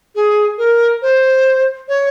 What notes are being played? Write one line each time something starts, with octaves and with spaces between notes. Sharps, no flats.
G#4
A#4
C5
C#5